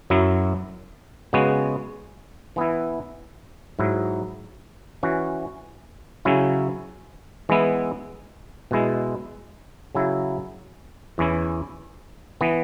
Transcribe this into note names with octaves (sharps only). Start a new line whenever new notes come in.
F#2 F#3 E4
C#3 G#3 B3 F#4
E3 B3 E4
G#2 F#3 E4
E3 C#4 F#4
C#3 F#3 C#4 E4
E3 G#3 B3 E4
B2 G#3 E4
C#3 F#3 E4
E2 E3 C#4 E4
E3 B3